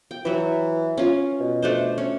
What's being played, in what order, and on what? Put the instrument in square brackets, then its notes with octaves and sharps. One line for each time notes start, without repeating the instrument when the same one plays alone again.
[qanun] G5
[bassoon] E3 [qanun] F#3 E5
[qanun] C#4 F4
[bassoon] B2
[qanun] A3 D4 C5
C#4